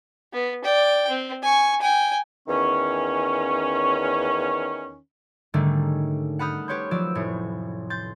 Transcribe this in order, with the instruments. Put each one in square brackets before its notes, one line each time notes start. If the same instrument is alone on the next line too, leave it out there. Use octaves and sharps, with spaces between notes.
[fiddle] B3
D5 G5
C4
G#5 C#6
G5 G#5
[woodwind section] E2 D#3 C#4
[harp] G#2 D3 D#3 G3 A3 C#4
F#5 A5 B5 D#6 F6 G6
G4 B4 C#5 C6 G6
F3 F#3 D5 E6
F1 A2 C#5
C6 G6 A6